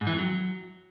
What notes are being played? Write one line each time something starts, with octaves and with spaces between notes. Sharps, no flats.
G#2
E3
F2
F#3